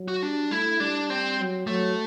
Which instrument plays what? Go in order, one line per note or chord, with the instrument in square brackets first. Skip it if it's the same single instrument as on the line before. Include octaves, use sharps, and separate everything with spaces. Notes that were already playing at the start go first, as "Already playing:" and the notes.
Already playing: [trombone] F#3
[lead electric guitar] F#4
[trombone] G3 [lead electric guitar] D4
[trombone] A3 [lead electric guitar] E4
[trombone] G3 [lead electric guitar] D4
[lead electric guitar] C4
[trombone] F#3
[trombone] F#3 [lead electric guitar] A3